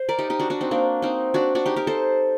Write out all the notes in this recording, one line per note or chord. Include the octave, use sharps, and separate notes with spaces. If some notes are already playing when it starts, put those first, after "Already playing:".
Already playing: C5
A#4 D5
D#4 G4
D#4 G4
D4 F#4
D4 F#4
C4 D#4
A#3 D4
C4 D#4
D4 F#4
D4 F#4
D#4 G4
G4 A#4
A4 C5